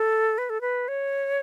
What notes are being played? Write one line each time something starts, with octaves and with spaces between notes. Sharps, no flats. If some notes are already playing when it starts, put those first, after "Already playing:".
Already playing: A4
B4
A4
B4
C#5